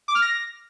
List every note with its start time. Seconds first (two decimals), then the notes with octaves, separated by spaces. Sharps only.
0.08 D6
0.15 F6
0.22 A#6